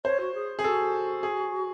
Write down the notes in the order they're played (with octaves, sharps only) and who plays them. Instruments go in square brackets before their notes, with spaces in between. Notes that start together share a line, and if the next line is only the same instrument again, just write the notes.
[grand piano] C5 [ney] C#5
[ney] F#4
G#4
[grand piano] G#4
[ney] F#4 [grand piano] A4
[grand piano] G#4